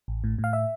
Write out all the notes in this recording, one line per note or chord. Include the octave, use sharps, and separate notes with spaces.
A1
A2
A2
F5
E5